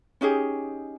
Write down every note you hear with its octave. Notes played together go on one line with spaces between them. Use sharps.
C#4 D#4 G4 G#4